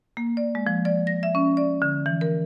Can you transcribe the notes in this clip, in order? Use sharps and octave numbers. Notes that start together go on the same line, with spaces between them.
A#3
D5
G#3
F3
D5
A#6
E5
C#4
D5
D3
E3
A#4